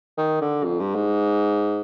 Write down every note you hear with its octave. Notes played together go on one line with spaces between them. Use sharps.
D#3
D3
F2
G2
G#2